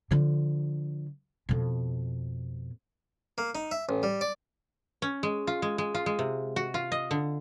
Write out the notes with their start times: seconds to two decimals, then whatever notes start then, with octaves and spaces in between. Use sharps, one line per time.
0.11 D3 F3
1.49 F2 B2
3.38 A#3
3.55 D#4
3.71 E5
3.89 A1
4.03 G3
4.21 D5
5.02 C#4
5.23 G#3
5.47 F4
5.62 G#3
5.78 G#3
5.95 F4
6.06 G#3
6.19 C3
6.56 F#4
6.74 F4
6.92 D#5
7.11 D3